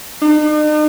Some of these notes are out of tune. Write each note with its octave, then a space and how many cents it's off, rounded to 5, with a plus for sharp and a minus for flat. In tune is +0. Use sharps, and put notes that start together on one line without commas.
D#4 -45